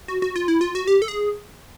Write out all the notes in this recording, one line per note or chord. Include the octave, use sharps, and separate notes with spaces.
F#4
F#4
F4
E4
F4
F#4
G4
A4
G#4